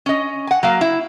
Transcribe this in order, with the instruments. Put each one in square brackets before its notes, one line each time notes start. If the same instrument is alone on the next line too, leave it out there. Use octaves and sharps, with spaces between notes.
[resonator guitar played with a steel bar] C#4 D#5
F#5 G#5
F#3 A#3 F5
E4